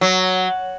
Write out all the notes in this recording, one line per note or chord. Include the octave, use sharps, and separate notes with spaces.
F#3